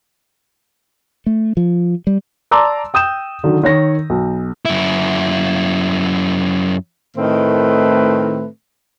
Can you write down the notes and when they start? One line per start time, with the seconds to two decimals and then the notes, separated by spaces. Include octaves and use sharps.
1.26 A3
1.57 F3
2.07 G3
2.51 D5 A5 A#5 C6 D6 E6
2.94 G5 D#6 G6 E7
3.44 D3 D#3 F#3
3.63 D#3 C#5 A#6
4.10 B1
4.65 F#2 E4
7.17 A2 D#3 A3 C4 B4